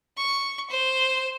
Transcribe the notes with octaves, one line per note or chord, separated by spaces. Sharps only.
C#6
C5